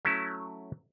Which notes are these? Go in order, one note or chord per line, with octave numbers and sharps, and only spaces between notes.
F#3 A3 C#4 E4